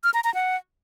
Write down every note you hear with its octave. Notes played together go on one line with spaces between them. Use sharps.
F6
A#5
A#5
F#5